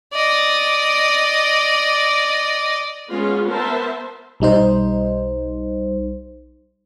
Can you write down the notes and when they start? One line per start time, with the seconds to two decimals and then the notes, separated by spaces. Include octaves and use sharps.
0.13 D5 D#5
3.11 G#3 B3 C#4 F4 G#4
3.47 B3 A#4 C5 E5 A5
4.40 B1 G3 D#4 C5